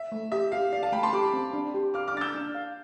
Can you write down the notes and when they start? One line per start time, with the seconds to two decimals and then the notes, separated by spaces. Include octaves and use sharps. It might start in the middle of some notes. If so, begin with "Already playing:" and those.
Already playing: E5
0.12 A3
0.32 G4 E5
0.52 G4 F5
0.73 D5 F5
0.83 F5 A5
0.92 A3 G5 B5
1.03 A5 C6
1.13 G4 B5 D6
1.34 C4
1.53 D4
1.74 G4
1.94 F5 D6 F6
2.08 D6 F6
2.14 D4 A6
2.21 E6 G6
2.35 D4
2.55 F5